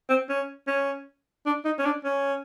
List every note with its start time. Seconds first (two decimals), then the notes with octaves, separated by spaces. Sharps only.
0.09 C4
0.29 C#4
0.67 C#4
1.46 D4
1.64 D#4
1.79 C#4
1.85 D4
2.04 C#4